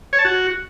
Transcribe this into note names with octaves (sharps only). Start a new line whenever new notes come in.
C#5
A5
F#4